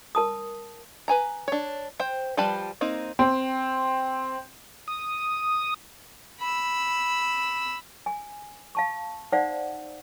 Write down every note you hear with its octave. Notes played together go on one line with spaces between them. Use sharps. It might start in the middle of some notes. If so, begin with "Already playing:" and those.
A#4 A5 D#6
B4 G#5 A#5
D4 C#5
C5 G5
F3 G3 B4 A5 B5
A#3 C4 D#4
C4
D#6
B5 E6
G#5
F5 A5 C#6
D#4 C5 D5 F5 F#5